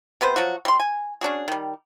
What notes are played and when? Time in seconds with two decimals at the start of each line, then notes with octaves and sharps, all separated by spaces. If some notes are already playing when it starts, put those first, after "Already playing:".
0.21 C3 B3 B4 C5
0.36 F3 F#3 F#4
0.65 G3 C6
0.80 G#5
1.21 C#4 D4 F#4 G#4
1.48 D#3 G3